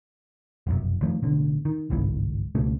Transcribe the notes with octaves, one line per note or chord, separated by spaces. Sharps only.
F1 B1 F#2
D#3 F3 A3
A1 B2 D3
D#3
G1 C2 G#2 E3
C#2 B2 A3 C#4